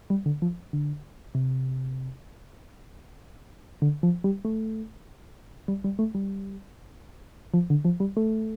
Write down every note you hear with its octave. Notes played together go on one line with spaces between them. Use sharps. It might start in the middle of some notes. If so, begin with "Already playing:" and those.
G3
D3
F3
D3
C3
D3
F3
G3
A3
G3
G3
A3
G3
F3
D3
F3
G3
A3